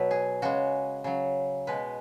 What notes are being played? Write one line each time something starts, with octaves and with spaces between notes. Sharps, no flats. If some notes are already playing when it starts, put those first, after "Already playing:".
Already playing: B2 F#3 B4
G#4
C#3 G#3 F#4
C#3 F#3
B2 G#3 B4